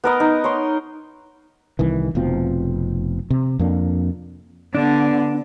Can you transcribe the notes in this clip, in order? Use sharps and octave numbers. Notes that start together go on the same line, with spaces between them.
B3 A#4 D#5
D#4
C#5 C6
C2 D#3 E3
F1 B2 F3 C4
C3
F2 A#3 D4
D3 B3 D4